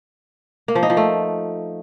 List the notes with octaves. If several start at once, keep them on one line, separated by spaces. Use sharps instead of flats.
A#3
F3
D#4
F3
A3